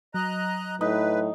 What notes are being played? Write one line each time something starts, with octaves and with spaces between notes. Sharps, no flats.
F#3 D#5 A#5 F#6
A2 D#4 B4